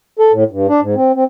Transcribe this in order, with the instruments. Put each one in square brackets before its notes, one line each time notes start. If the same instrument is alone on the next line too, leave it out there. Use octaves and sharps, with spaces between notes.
[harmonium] A4
A2
G2
D4
G#2
C4
C4